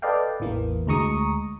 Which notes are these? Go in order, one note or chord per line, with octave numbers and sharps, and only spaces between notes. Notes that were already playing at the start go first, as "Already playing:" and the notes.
A4 B4 D5 D#5 F5 G5
A1 E2 E3 A#3
D2 G#3 A#5 C#6 D#6 C#7